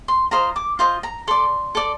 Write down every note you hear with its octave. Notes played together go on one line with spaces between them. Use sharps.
C6
F4 C5 D#5 A#5
D6
F4 C5 D#5 C6
A#5
A4 D5 C6
A4 D5